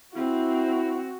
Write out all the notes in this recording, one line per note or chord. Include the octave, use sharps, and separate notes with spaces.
C4 E4 F#4